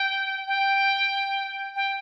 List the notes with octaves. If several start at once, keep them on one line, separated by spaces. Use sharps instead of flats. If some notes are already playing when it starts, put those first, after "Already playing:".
Already playing: G5
G5
G5